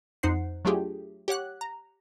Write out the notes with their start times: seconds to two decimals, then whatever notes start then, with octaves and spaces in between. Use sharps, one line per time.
0.23 F2 D#4 C5 F#5 C7
0.65 F#3 A3 D4 F4 G4 G#4
1.28 G4 C#5 F#5 F#6
1.61 A#5